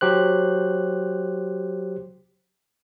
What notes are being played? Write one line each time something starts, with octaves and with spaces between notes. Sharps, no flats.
F#3 G4 C5 F#6